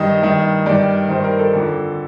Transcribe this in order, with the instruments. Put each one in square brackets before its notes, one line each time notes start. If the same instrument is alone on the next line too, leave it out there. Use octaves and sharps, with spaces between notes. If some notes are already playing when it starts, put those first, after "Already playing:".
Already playing: [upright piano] G2 D#3 D#5
G2 D#3
G2 D#3 D5
G2 D#3 C5
A#4
A4
F2 D3